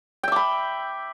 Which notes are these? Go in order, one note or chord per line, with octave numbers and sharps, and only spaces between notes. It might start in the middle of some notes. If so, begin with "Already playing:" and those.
E5 G5 B5 D6